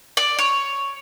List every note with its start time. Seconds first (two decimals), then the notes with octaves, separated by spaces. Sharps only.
0.17 D5
0.39 C#5